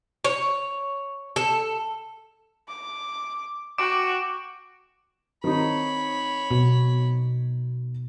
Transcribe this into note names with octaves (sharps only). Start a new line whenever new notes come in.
C#5
A4
D6
F#4 G5 D6 D7
D#3 C4 D#4 C#5 B5
B2